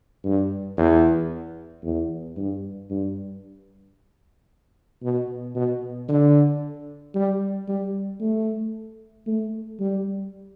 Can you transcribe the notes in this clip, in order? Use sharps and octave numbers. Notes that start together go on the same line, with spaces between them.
G2
E2
E2
G2
G2
B2
B2
D3
G3
G3
A3
A3
G3